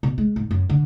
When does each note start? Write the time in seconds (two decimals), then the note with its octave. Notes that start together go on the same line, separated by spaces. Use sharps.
0.03 B2
0.18 G#3
0.36 G#2
0.51 F#2
0.70 D3